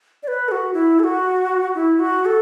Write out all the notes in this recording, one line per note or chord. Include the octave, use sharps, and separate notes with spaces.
D5
B4
A4
F#4
E4
A4
F#4
E4
F#4
A4